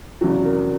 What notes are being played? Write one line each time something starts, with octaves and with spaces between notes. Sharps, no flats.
F1 E2 C#3 F#3
A#4